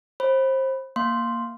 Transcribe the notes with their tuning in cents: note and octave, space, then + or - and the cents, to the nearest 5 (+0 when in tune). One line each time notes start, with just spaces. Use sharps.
C5 +25 B5 +0
A#3 +0 F5 +0 C6 +0